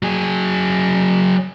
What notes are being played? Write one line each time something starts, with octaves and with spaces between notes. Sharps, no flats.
F#3 G#4